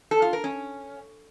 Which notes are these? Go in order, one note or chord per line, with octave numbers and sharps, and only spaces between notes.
A4
F4
A#4
C#4